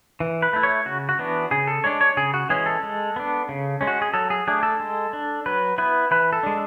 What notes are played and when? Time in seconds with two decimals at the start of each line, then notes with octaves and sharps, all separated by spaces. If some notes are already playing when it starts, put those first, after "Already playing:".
0.20 E3
0.42 B4
0.53 A3 E4
0.63 C#5
0.86 C#3 F#4
1.09 F#4
1.19 E3 B3 D4
1.51 C#3 G#4
1.67 A4
1.84 G#3 D4 C#5
2.01 C#5
2.17 C#3 G#4
2.34 F#4
2.50 E3 G#3 C#4 G#4
2.66 A4
2.83 G#3
3.16 B3 D4
3.49 C#3
3.81 G#3 C#4
3.87 F#4
4.02 G#4
4.14 F#3 A4
4.30 G#4
4.48 A3 D4 G#4
4.63 A4
4.80 G#3
5.13 D4
5.46 F#3 B4
5.78 B3 E4 B4
6.11 E3 B4
6.33 A4
6.43 G#3 D4